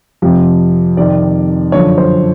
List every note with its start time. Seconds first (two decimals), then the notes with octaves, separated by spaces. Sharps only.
0.22 F2 C3 F3
0.97 F2 C3 D#3 D5
1.72 F#2 D3 F3 C#5
1.98 C5